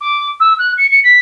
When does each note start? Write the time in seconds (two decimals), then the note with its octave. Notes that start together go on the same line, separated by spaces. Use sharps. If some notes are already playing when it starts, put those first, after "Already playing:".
0.01 D6
0.40 E6
0.58 F#6
0.77 C#7
0.90 C#7
1.03 B6